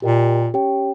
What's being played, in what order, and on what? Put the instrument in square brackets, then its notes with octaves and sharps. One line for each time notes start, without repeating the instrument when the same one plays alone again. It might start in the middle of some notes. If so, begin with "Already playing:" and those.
[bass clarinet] A#2 [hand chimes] G4 A#4 D#5 G5
[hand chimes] C#4 G4 C#5 G5